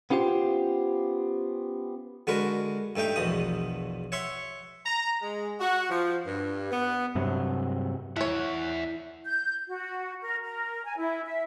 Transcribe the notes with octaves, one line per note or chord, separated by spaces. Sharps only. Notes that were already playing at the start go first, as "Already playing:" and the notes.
B3 C#4 F4 G4 C5
D3 G#3 F#4 A#4 B4
G2 A3 D#4 G5
A#1 E2 B2 D#6
C#5 E5 F#5 C6 C#6
A#5
G#3
F#4
F3
G2
B3
G2 C3 F#3
A3 E4 C#5 E5 F#5
G6
F#4
A#4
A#4
G#5
E4
E5